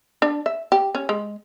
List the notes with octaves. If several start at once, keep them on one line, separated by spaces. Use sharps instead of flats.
D4
E5
G4
C#4
G#3